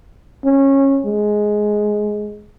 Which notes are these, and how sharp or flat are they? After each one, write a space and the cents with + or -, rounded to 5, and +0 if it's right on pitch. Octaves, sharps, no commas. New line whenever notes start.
C#4 -20
G#3 +10